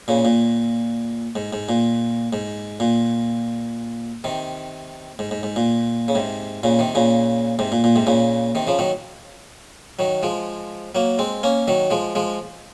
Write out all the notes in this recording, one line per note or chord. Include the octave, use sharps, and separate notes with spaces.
A#2 C#3
A#2
G#2
G#2
A#2
G#2
A#2
C3 D#3
G#2
G#2
G#2
A#2
C#3
G#2 C3
A#2 C#3
C3 D#3
A#2 C#3
G#2 C3
A#2
A#2
G#2 C3
A#2 C#3
C3 D#3
C#3 F3
D#3 F#3
D#3 F#3
F3 G#3
F#3 A#3
G#3 C4
A#3 C#4
D#3 F#3
F3 G#3
F3 G#3